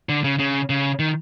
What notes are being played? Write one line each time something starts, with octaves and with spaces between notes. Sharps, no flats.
D3
C#3
C#3
C#3
D#3